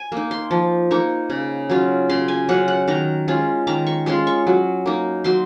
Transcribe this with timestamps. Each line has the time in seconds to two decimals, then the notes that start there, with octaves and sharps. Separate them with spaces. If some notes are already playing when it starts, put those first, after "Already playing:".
Already playing: G#5
0.12 A#3 D#4
0.31 C6
0.51 F3
0.91 A#3 D#4 C#6
1.30 C#3
1.70 F#3 C#4 F4
2.09 C#3 C6
2.28 G#5
2.49 F#3 C#4 F4 F#5
2.68 F#5
2.88 D#3 A#5
3.28 G#3 C#4 F4
3.67 D#3 A#5
3.87 C#6
4.06 G#3 C#4 F4 C6
4.27 C#6
4.47 F#3
4.86 A#3 D#4
5.24 F#3 C6